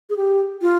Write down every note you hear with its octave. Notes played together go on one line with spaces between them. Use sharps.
G#4
G4
F4